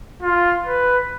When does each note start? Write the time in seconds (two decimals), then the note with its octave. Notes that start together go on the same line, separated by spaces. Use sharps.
0.22 F4
0.67 B4